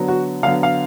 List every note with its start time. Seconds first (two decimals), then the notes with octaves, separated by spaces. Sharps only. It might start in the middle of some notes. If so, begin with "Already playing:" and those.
Already playing: D3 F#3 B3
0.08 F#4
0.43 D3 F#3 B3 F5
0.63 F5